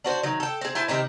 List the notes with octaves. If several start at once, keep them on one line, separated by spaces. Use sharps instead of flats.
D4 F#4 C5
D#3 F#3
A4 G5
C4 G#4
E4 C5 G#5 A5
C3 D#3 C4 D#4